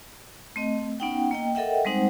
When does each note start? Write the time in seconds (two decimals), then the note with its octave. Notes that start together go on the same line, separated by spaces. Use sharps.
0.56 A3 C4 D#5
1.00 B3 C#4 D#4 F#5 G5
1.31 A#3 D#5 G5
1.55 A4 A#4 D#5 E5 F#5 G5
1.85 G3 G#3 C4 D#4 C5 F#5